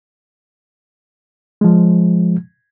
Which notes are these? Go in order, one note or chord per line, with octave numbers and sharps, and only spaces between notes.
F3 G#3